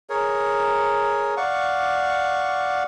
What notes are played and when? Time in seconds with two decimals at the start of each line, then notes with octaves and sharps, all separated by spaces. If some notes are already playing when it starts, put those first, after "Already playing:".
0.10 G#4 A#4 C#5
1.37 D5 F5 F#5 C#6